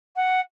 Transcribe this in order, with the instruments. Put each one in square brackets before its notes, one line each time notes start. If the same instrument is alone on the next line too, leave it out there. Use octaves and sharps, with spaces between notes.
[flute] F#5